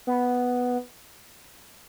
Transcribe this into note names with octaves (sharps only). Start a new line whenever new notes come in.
B3